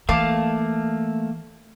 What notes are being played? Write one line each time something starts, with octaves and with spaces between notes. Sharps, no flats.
E3 A3 A#3 F5 A5 D6